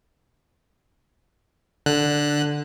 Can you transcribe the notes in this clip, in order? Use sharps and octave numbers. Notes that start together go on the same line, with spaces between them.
D3 F#6